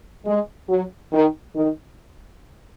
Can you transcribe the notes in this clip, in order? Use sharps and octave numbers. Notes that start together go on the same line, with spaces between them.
G#3
F#3
D#3
D#3